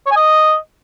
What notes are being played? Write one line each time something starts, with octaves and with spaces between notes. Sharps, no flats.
C#5
G#5
D#5